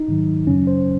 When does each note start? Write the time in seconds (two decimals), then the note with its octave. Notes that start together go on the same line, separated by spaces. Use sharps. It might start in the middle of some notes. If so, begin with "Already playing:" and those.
Already playing: D#4
0.08 G#2 D#3 F#3
0.47 F#2 C#3 F#3 C#4
0.67 C5